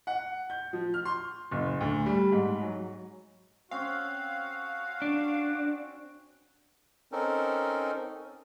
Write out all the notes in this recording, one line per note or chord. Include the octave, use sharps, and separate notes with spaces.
F#5
G6
F3
F6
C6
F#1
D2
G3
G#2
F#3
C4 C#4 F#4 F5
D4
C4 C#4 D#4 A4 A#4